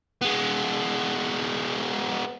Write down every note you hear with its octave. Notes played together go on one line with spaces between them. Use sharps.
G#3 B3